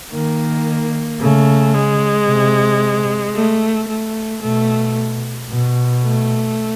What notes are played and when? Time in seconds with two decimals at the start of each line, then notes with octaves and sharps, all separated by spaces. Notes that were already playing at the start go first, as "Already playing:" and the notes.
0.13 D#3 A#3
1.20 C#3 A3
1.74 G#3
2.27 C3
3.35 A3
3.89 A3
4.42 B2 A3
5.50 B2
6.04 A3